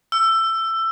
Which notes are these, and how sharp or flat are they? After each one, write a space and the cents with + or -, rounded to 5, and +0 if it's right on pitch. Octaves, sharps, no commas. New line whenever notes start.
E6 +15